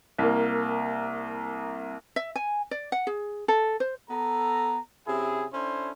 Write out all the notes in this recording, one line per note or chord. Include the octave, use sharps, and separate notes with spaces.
C2 A#3
E5
G#5
D5
F#5
G#4
A4
C5
B3 A4 A#5
C3 C#4 E4 G#4
C#4 D4 E4 A4 C5